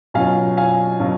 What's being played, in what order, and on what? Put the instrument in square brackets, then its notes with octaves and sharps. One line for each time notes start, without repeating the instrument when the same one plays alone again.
[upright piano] B2 F#3 C#4 F4 F5 G#5
F5 G#5
B2 F#3 C#4 F4